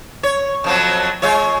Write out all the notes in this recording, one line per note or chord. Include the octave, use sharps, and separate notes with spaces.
C#5
F2 F3 F#3
G#3 F4 C#5